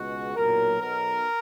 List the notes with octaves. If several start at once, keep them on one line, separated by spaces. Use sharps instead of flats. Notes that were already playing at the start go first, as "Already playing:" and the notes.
Already playing: C#2 B2 G#3 F#4
B1 A#2 F#3 A#4
B1 B2 F#3 A#4